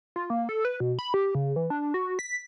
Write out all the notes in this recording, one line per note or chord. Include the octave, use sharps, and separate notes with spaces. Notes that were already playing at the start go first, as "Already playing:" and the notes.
F4
A#3
A4
B4
B2
B5
G4
C#3
E3
D4
F#4
B6